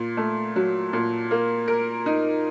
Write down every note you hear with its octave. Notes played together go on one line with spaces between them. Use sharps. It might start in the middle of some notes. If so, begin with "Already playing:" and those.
Already playing: A#2
A3
F#3
A#2
A#3
A#4
D#4